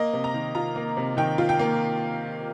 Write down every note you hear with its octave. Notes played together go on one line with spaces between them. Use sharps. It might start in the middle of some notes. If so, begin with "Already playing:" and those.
Already playing: A#3 D#5
C3
A#5
D#3
F4 A#5
A#3
C3
D#3 G5
F4
G5
A#3